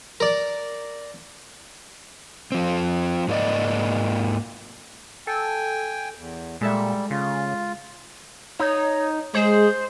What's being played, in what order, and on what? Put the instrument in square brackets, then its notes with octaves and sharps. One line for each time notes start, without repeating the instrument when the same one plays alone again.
[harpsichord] A#4 D5
[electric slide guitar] F3 C4
G#2 F#3 A#3 D#4 D5 D#5
[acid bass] A4 [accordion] G5 G#5
[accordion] E2
[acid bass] A#2 [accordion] G3 [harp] G#3 A4 E5
[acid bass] C#3 [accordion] F4
[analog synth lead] D#4 [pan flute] C#5
[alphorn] G#3 [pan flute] G#4 [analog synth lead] C5